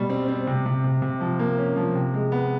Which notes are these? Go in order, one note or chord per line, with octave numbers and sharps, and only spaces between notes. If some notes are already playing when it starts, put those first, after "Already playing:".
Already playing: B2 G3
C4
C4
C3
C3
C3
C3
F3
A#3
C#4
F3
C3
G#3
B3